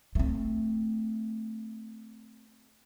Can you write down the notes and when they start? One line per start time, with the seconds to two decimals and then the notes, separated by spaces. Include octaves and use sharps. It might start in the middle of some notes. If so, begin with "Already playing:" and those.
0.15 A3 C4